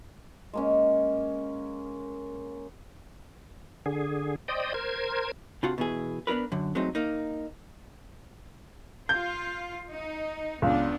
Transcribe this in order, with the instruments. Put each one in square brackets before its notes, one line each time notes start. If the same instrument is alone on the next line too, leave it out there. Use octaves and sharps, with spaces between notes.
[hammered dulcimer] G#3 A#3 C#4
[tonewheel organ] D3 G#4
C5 D5 D#5 G5 D#6
A#4 C5 G#6
[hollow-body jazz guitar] C3 D4 F4 F#4 F5 F#5
B2 E3 G#4
B3 D4 F4 A#4 B4
F#2 D3
F#3 G#3 A3 C4 D#4
A#3 D#4
[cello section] F4 [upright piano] G6
[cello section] D#4
[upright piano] C#2 [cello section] B3 D4